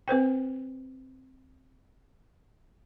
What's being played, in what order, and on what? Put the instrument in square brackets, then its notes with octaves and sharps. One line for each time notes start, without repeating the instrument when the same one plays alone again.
[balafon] C4 B4 C5 G5